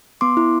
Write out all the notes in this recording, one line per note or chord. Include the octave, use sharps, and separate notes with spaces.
B3 C6 D6
E4